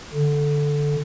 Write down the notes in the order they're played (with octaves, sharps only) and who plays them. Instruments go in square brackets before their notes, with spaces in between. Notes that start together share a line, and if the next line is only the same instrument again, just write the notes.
[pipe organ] D3